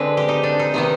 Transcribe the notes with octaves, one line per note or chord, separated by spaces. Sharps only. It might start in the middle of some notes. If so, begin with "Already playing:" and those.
Already playing: D3 G#3 C4 B4
G4
D#4
D4
D#4
C3 D#3 B3 D#4